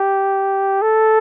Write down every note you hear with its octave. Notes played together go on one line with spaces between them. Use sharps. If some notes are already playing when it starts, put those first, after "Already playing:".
Already playing: G4
A4